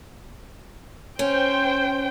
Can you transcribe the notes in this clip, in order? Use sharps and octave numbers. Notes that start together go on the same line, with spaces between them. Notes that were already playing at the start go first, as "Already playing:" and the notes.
C#4 C5 G5